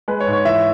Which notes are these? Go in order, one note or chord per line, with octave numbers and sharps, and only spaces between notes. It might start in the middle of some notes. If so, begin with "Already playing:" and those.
G#3 B4
C#5
G#2
C#5
E3 E5